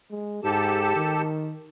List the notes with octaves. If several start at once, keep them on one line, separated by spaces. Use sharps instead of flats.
G#3
G#2 G4 A4 A5
D#3